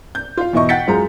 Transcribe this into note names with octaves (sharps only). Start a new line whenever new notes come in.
G6
F4 F5
E2 B2 E4 D#5 C#6
F#5 G5 G6 A6 B6 C#7
F#2 F#3 G#3 F4 G#4 A#5